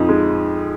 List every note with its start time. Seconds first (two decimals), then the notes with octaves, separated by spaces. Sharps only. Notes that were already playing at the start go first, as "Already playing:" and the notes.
Already playing: F2 F3 D#4
0.09 G#3